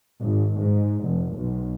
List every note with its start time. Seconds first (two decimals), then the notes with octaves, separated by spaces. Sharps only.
0.19 G#1
0.57 G#2
1.03 F1
1.35 B1